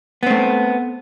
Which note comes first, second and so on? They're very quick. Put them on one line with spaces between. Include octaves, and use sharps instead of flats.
B3 C4 A3